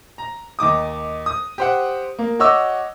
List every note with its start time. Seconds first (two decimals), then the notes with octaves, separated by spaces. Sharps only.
0.18 A#5
0.59 D#2 D#4 D6 D#6
1.26 D#6
1.58 G4 C5 F#5
2.19 A#3
2.39 F#4 C#5 D#5 C#6 D6 E6